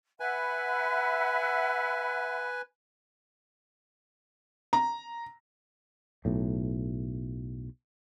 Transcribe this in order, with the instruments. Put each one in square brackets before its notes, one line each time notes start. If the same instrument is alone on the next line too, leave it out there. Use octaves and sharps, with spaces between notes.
[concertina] B4 G#5 [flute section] E5 F#5 B5
[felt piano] A#5
[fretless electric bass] B1 A2